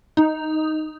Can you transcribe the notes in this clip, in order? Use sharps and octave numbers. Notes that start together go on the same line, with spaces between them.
D#4